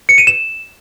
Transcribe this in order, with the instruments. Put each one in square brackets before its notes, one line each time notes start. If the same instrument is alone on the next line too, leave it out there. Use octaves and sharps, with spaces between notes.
[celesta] C#7
D#7
E7